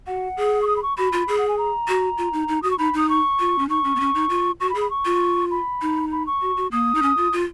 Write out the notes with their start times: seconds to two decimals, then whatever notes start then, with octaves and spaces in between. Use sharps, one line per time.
0.07 F#4 F#5
0.37 G#4
0.62 C#6
0.67 D#6
0.76 B5
0.83 C#6
0.97 F#4 B5
1.13 F4
1.28 G#4
1.38 F#5
1.48 G#5
1.58 A#5
1.88 F#4
2.18 F4
2.33 D#4
2.48 D#4
2.62 F#4 D#6
2.71 C#6
2.78 D#4 B5
2.94 D#4 D#6
3.09 C#6
3.40 F4
3.59 C#4
3.69 D#4 C#6
3.84 C#4
3.96 B3
4.00 C#4
4.15 D#4
4.30 F4
4.60 F#4 C#6
4.70 B5
4.75 G#4
4.81 B5
4.90 C#6
5.05 F4
5.51 B5
5.81 D#4
6.12 B5
6.26 C#6
6.41 F#4
6.57 F#4
6.71 A#3 D#6
6.95 D#4
7.02 C#4
7.17 F4
7.33 F4